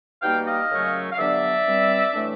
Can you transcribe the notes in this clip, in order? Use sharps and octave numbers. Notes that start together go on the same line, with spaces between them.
B2 G3 A#3 D#4 F5 G5
D#5 F5
F#2 C#3 F#3 A3 C#4
F5
G2 D3 F#3 B3 D4 D5 E5
B2 G3 C4
A2 E3 A3 D4